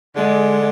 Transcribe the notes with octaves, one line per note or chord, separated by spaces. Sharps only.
D3 G#3